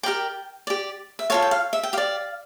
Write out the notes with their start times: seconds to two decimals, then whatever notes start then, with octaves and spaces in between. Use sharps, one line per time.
0.03 G4 A#4 D5 G5
0.67 G4 D5
1.19 E5
1.30 F4 A4 C#5 F5
1.42 G5
1.51 F5
1.73 E5
1.83 G5
1.93 G4 D5 F5